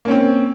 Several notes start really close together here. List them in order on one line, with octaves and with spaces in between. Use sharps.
A#3 C#4 C4